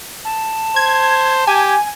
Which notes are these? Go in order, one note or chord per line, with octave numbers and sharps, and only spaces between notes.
A5
C5 G#6
G4 G#5